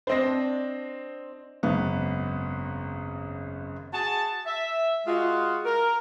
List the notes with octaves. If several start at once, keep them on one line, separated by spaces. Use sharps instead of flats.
C4 D4 C5 D#5 C6 A#6
G#1 F#2 C#3 B3
F#4 G#4 G#5 A5
E5
G#3 F4 F#4
A#4